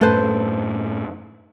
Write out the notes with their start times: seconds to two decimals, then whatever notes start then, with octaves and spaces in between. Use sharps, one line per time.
0.01 F#2 A2 A3 A4 B4 C5